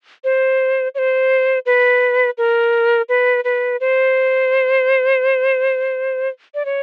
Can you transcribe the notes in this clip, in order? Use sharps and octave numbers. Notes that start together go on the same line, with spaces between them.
C5
C#5
C5
B4
A#4
B4
B4
C5
D5
C#5